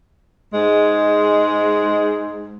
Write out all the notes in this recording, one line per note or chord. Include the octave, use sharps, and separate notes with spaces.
G#2 G#3